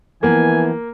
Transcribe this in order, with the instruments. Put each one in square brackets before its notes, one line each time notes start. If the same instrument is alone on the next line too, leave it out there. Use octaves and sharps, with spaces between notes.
[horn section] E3 [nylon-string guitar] F3 B3 [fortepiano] A#3 [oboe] G#5